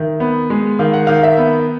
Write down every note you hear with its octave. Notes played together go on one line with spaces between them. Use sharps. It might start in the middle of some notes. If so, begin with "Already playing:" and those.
Already playing: D#3 E5
B3
G#3
D#3 F5
F#5
D#3 F5
E5
B3